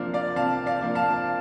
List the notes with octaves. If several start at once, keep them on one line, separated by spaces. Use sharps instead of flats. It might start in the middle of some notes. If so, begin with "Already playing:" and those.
Already playing: C3 F3 A#3 D4 F5
D5 F5
C3 F5 A5
D5 F5
F3 A#3 D4
F5 A5